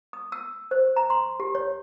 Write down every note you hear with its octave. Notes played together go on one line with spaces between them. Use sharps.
D#6
E6
C5
A#5
C6
G4
C#5